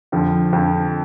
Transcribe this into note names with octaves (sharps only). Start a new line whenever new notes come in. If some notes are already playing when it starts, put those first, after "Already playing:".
F2 D3 F3
F2 D3 F3